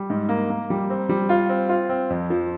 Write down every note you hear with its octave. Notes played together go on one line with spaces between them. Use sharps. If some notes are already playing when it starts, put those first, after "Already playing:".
Already playing: G3
G#2
A#3
A#3
G3
C4
G3
F4
C4
F4
C4
F2
F3